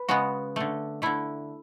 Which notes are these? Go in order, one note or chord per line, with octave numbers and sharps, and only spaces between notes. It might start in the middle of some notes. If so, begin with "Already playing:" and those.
Already playing: B4
C#3 G#3 B3 F#4
D3 A3
D3 A3 E4